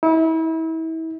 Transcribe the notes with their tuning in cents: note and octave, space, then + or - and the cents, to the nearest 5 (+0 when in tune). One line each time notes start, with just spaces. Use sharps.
E4 -35